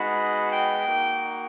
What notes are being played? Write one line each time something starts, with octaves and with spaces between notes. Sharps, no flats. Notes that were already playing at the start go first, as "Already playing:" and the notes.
Already playing: G#3 B3 D#4 F#4 B5
G5
A#3 D#4 F#4